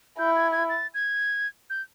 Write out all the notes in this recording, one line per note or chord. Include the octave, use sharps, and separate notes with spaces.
E4 G6
G#6
G#6
A6
G#6
G6